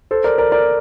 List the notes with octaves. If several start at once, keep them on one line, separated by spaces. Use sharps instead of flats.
A4 C5
A#4 D5
A#4 D5
A#4 D5